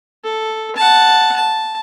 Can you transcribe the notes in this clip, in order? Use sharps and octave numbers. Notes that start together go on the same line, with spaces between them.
A4
F#5 A5
A5